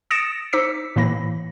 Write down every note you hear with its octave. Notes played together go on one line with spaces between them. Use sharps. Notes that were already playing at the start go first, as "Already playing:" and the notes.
D#6 A6 A#6 C#7 D7 E7
D#4 C5 D6 E6 B6 C#7
A2 E3 A#3 B5 A#6